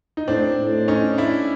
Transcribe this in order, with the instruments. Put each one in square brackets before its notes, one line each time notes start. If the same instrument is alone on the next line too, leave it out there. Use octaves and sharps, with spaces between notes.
[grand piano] D#4
[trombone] A2 [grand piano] C4 D4
[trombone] A2
[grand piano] C#4 D#4
D4 E4